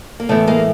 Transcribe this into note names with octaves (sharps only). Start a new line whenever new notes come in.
A#3
A2 E3 A3 B3
G#3 A#3